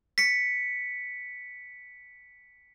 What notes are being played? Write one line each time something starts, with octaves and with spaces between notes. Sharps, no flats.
B6 C#7